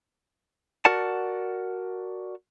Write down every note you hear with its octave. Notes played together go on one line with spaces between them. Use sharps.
F#4 A#4 D5 F#5 A5